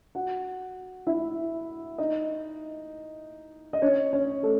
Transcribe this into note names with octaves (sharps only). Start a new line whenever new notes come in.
F#4 F#5
E4 E5
D#4 D#5
D#5
C#4 C#5
C#4 C#5
A3 A4